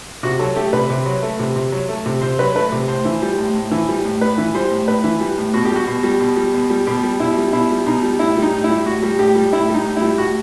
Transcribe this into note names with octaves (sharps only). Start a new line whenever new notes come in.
C3 F#4
F#3 A4
A3 G4
C3 B4
C3
F#3
A3
C3
C3
F#3
A3
C3
C3 C5
F#3 B4
A3 B4
C3
A2 C5
E3
G3
A2
A2
E3
G3
A2
A2 B4
E3
G3 C5
A2
A2 B4
E3
G3
A2
B2 F#4
G4
G3
F#4
B2
G3
B2
G3
B2
G3
B2 G4
G3
B2 E4
G3
B2 E4
G3
B2 D#4
G3
A2 E4
G3
D#4
A2
E4
G3
A2 F#4
G3
A2 G4
G3
A2 E4
G3
D#4
A2
E4
G3
A2 F#4